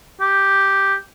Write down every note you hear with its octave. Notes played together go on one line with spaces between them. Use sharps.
G4